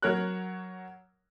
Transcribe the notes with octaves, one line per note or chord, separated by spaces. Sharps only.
F#3 A#4 C#5 F#6